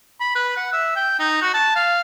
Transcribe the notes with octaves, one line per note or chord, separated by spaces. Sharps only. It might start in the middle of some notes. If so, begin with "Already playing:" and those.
B5
B4
F#5
E5
G5
D#4
F#4
A5
F5